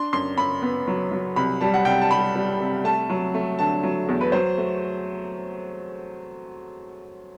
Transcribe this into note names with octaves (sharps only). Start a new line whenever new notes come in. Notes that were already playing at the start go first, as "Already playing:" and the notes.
Already playing: D4 C6
F#2 C6
F#2 B5
B3
F#3
F#3
C2 B5
G3 A5
F#5
C2 G5
A5
G3 B5
G3
C3
A3 A5
F#3
A3
D3 A5
F#3
E2
B4
F#3 C5
A3